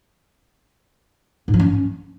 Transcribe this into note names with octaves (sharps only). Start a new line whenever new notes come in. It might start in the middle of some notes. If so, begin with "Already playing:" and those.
G#2
F3
C#4